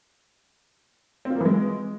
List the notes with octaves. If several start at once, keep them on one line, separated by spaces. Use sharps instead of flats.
C4
F4
A#3
E3
G#3